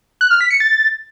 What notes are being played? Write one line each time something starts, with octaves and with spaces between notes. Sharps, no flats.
F#6
F6
B6
C#7
A6